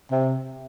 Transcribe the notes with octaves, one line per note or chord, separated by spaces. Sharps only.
C3